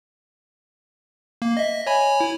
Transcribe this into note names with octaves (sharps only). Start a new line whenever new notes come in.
A#3
D#5 E5
C#5 G#5 B5
E4